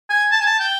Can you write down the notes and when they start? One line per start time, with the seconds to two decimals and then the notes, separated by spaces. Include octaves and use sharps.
0.10 G#5
0.31 A5
0.40 G#5
0.46 A5
0.60 G5